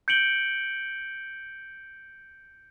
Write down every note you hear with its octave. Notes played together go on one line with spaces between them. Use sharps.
G6 C#7 D7 F#7 G7